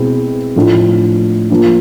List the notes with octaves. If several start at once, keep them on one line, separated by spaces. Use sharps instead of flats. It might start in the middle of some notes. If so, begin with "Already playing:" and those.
Already playing: B2 G#3 C4 E4
A2 F3 A3 D4
F3 A#3 D4